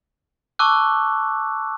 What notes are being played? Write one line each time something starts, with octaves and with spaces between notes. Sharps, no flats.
A5 C#6 D6 E6 F#6